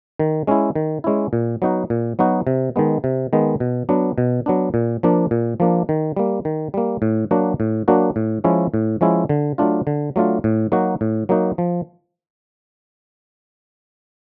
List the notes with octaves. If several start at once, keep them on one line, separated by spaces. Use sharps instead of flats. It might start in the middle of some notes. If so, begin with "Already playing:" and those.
D#3
G#3 C#4 E4
D#3
G#3 C#4 E4
A#2
F#3 B3 D#4 F#4
A#2
F#3 B3 D#4 F#4
C3
D#3 G#3 B3
C3
D#3 G#3 B3
B2
F#3 B3 D4
B2
F#3 B3 D4
A#2
F3 A#3 D4
A#2
F3 A#3 D4
D#3
G3 A#3
D#3
G3 A#3
A2
F#3 A#3 D4 F#4
A2
F#3 A#3 D4 F#4
A2
F3 G#3 C#4 E4
A2
F3 G#3 C#4 E4
D3
F#3 A3 D4 F4
D3
F#3 A3 D4 F4
A2
F#3 A#3 D#4 F#4
A2
F#3 A#3 D#4 F#4
F3